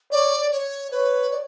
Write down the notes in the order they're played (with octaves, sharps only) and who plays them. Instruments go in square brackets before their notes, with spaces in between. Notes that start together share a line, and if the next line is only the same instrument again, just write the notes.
[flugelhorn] C#5 [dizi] D5
[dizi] C#5
[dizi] B4 [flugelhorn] C#5
[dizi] D5